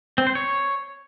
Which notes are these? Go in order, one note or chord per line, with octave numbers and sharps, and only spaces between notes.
C4
C5
C#5